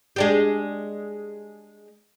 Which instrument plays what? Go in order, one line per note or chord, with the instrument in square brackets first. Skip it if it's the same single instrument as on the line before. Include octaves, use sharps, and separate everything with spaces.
[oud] G#3 D4 G4